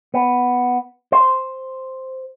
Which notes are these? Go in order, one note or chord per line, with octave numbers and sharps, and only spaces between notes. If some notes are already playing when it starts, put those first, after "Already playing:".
B3
C5